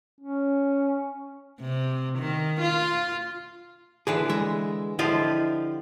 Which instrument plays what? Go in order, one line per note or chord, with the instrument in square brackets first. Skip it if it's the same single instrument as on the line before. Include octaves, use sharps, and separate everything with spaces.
[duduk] C#4
[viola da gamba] C3
D#3
F4
[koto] D3 E3 B4 [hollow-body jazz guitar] G#4
[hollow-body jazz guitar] G#3 [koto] E5
[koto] D3 F3 F4 [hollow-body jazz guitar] E4 G4 D#5